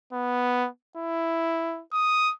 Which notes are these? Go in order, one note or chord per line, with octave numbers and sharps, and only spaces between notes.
B3
E4
D#6